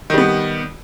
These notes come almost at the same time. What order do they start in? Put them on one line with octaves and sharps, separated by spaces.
D#3 G3 B3